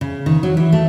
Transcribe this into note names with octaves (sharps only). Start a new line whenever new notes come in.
C#3
D#3
F#3
E3
A3